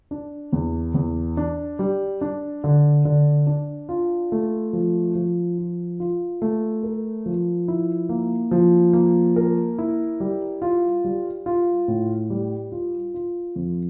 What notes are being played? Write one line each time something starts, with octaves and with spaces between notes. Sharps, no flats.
D4
E2
E2
D4
G3
D4
D3
D3
D4
F4
A3
F3
F3
F4
F4
A3
A#4
F3
E4
A#3
F3
A#3
A#4
E4
G3
F4
G3
F4
A2
G3
F4
F4
F2